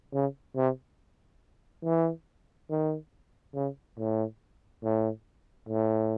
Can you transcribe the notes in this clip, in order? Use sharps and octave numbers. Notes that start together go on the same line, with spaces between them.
C#3
C3
E3
D#3
C#3
A2
A2
A2